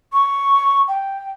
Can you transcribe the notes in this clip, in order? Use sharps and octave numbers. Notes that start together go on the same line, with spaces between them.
C#6
G5